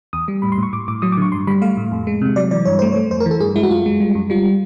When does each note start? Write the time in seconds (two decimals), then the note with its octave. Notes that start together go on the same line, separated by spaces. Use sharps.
0.13 E2 D#6
0.28 G3
0.42 A2 B5
0.52 C6
0.58 A2 C#6
0.73 A2 D6
0.88 A2 D6
1.02 F#3 D#6
1.12 D6
1.17 D3 C#6
1.32 G2 C6
1.47 G3 B5
1.62 A3 F5
1.77 A2
1.92 F2
2.07 G#3
2.21 C3
2.36 F#3 D5
2.51 E3 D5
2.65 G2 C#5
2.79 A3 C5
2.92 C#5
2.96 A3
3.11 F2 C5
3.20 A#4
3.26 E3
3.31 A4
3.40 G2 G#4
3.56 G#3 E4
3.63 F#4
3.70 F#2 F4
3.86 G#3
4.00 G3
4.15 F#2
4.30 G3 F4